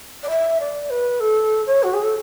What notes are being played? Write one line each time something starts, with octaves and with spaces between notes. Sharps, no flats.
D5
E5
D5
B4
A4
C#5
F#4
G#4
A4